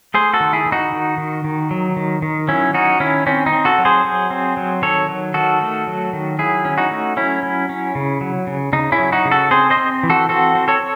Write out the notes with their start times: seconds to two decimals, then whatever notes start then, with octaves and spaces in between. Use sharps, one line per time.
0.14 A3 G#4 C5
0.33 F#4 A4
0.40 D#3
0.53 E4 G#4
0.66 D#3
0.72 D#4 F#4
0.92 D#3
1.18 D#3
1.44 D#3
1.71 F#3
1.96 D#3
2.22 D#3
2.48 F#3 C#4 E4
2.74 C#4 D#4 F#4
3.00 D#3 C#4 E4
3.26 C4 C#4
3.46 D#4
3.52 C4
3.65 F#4 A4
3.78 F#3
3.85 G#4 C5
4.05 F#3
4.30 C4
4.57 F#3
4.82 D#3 A4 C#5
5.09 F#3
5.34 D#3 F#4 A4
5.61 A3
5.87 F#3
6.13 D#3
6.39 F#3 E4 G#4
6.65 C#4
6.78 D#4 F#4
6.91 A3
7.17 F#3 C#4 E4
7.43 F#3
7.69 C#4
7.95 C#3
8.21 F#3
8.47 C#3
8.73 C#3 D#4
8.92 C#4 E4
8.99 F#3
9.12 D#4 F#4
9.25 C#3
9.31 F#4 A4
9.51 C4 G#4 C5
9.70 C5 D#5
9.77 C4
10.03 E3
10.10 F#4 A4
10.29 C4 F#4 A4
10.55 C4
10.68 A4 C#5